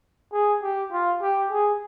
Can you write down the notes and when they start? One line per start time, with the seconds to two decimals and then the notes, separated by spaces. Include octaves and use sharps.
0.32 G#4
0.62 G4
0.92 F4
1.21 G4
1.51 G#4